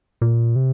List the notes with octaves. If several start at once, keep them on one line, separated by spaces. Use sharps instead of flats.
A#2
C3